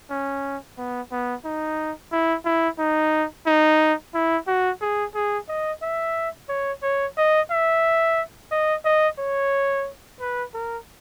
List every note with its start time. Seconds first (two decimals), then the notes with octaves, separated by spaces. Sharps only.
0.10 C#4
0.78 B3
1.11 B3
1.45 D#4
2.12 E4
2.45 E4
2.79 D#4
3.47 D#4
4.14 E4
4.47 F#4
4.81 G#4
5.15 G#4
5.49 D#5
5.82 E5
6.49 C#5
6.83 C#5
7.17 D#5
7.51 E5
8.51 D#5
8.85 D#5
9.19 C#5
10.20 B4
10.54 A#4